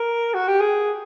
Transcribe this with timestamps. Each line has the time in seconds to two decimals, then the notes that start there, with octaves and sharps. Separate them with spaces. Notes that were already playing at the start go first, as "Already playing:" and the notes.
Already playing: A#4
0.34 F#4
0.47 G4
0.60 G#4